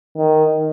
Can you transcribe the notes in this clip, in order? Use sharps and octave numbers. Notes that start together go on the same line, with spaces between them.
D#3